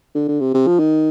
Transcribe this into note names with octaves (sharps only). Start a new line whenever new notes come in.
D3
D3
C3
C3
F3
D#3